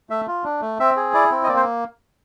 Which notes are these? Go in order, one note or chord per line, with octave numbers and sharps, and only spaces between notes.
A3 E5
F4
D4
A3
C4 E5
G#4
E4 D5
C4
D#5
A#3 D5
C5